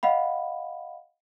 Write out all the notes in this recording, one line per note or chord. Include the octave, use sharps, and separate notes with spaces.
D#5 F5 F#5 B5